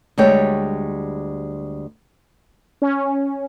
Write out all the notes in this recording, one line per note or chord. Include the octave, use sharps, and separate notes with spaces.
D2 G3 G#3 C#5 G5
C#4